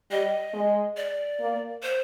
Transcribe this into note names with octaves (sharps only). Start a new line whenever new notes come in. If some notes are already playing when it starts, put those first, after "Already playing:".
G3 D#5
G#3
D5
A#3
C5